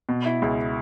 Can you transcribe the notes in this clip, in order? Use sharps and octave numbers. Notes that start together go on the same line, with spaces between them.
B2
E4
C#2